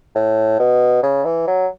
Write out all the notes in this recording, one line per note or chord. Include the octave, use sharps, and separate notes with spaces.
A2
B2
C#3
E3
F#3